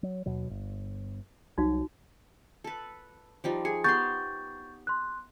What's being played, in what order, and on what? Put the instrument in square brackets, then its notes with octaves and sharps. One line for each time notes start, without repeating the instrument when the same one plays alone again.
[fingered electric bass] F#3
D#2 B2 F#3
G1
[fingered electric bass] C2 F#3 [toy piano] D#4 F#4
[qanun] A4 B4
F3 G3 D#4
[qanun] G#4 [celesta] C#7
[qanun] B3 G4 C6 [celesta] C#6 G6 A6
[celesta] C6 F#6